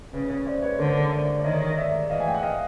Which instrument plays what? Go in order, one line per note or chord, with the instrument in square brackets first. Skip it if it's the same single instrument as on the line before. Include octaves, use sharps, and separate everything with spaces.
[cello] C#3 [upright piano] B4 C#5
[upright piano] B4 C#5
C5 D5
B4 C#5
[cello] D3 [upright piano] A#4 C5
[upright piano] C5 D5
D5
[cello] D#3 [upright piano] C#5 D#5
[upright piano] D#5
D5 E5
[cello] E3 [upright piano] D#5 F5
[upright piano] G#5
G5
F#5
D#5 F5